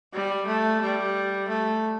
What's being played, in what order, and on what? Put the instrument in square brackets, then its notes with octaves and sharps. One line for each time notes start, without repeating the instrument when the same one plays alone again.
[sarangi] G3
A3
G3
A3